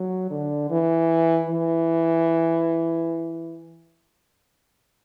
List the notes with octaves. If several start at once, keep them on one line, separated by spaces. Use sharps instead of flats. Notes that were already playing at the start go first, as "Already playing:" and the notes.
Already playing: F#3
D3
E3
E3